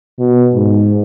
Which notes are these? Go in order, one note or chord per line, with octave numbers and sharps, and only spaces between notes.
B2
G#2